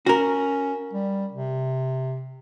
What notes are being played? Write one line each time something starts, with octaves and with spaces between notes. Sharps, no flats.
C#4 F#4 A#4
G3
C3